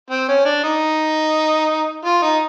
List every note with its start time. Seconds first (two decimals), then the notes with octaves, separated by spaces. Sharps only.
0.10 C4
0.28 C#4
0.45 D4
0.63 D#4
2.04 F4
2.22 D#4